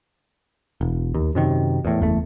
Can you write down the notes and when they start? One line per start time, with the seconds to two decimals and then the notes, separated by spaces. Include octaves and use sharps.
0.81 E1
1.14 D#2
1.35 F#2 C3 D#3
1.85 E2 A2
2.01 F#1 E2 A3